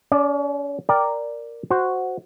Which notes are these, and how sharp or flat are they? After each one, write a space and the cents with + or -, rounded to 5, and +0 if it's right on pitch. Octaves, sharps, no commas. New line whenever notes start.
C#4 +40 D5 +0
A#4 +0 D5 +0 G5 +0
F#4 +0 C5 -5